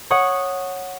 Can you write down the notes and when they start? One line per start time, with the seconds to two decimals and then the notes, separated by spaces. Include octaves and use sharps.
0.10 C#5 F#5 C#6 D#6